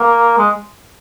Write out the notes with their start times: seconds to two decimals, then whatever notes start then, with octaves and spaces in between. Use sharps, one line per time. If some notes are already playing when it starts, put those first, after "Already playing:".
Already playing: A#3
0.38 G#3